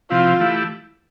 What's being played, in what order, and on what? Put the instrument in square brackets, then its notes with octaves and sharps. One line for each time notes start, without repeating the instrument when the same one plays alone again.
[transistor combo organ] C3 F3 C4 E4 [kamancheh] F4
[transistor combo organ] E3 A3 E4 G4